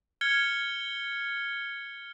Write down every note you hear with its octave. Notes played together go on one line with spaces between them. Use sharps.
F6 G#6 C#7 G7